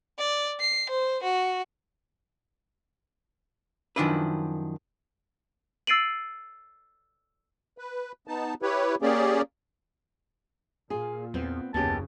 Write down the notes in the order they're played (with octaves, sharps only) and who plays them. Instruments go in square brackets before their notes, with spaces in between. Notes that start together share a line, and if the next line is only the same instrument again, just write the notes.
[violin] D5
C7
C5
F#4
[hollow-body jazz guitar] F#2 D#3 F3 D4 E4 B4
[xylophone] E6 A6 C7 D7 D#7 F#7
[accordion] B4
B3 D#4 A5
E4 G4 B4 C#5
A#3 C#4 G4 G#4 D5
[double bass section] A#2 [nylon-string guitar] F4 G#4
[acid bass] E2 [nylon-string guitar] B3 C4
[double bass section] F#1 C#3 [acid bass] D#2 [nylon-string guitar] B3 C#4 G4 [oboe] A5